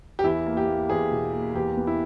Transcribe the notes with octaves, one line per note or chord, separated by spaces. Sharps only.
G4
E2 E4
A#3
G4
A#3
E2 G#4
B2
A#3
E2 G4
B3
E4